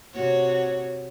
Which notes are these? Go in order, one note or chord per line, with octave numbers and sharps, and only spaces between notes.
C3 F#4 C#5